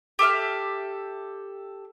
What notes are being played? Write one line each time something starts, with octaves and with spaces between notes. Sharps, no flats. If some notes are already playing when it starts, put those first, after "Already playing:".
G4 A4 E5 F6